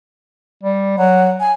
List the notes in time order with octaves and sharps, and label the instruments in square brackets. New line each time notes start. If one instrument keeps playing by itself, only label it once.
[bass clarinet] G3
[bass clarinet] F#3 [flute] F#5
[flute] G#5